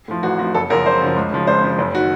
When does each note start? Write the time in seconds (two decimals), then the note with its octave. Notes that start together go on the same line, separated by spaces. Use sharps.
0.08 A2 F3
0.23 A1 F#4
0.39 A2 F3 F#4
0.55 F#1 A4
0.70 F#2 C#3 F3 A#4
0.85 F#1 C5
1.01 F#2 C#3 F3
1.16 C#2
1.32 C#3 F3
1.47 C#2 C5
1.63 C#3 F3
1.78 F#1
1.95 D#3 F#4